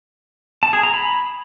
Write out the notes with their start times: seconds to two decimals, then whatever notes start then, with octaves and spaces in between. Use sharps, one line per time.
0.63 A5
0.73 G#4
0.83 A#5
0.94 B5